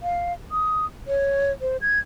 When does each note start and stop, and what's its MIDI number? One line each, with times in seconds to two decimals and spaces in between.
0.02 0.33 77
0.51 0.85 87
1.07 1.51 73
1.61 1.77 72
1.81 1.98 92